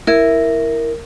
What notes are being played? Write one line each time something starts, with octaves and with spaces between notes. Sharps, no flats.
E4 A#4